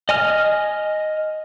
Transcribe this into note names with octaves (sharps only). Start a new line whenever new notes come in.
D#5 G#5 F6